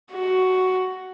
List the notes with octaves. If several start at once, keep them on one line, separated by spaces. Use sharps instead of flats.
F#4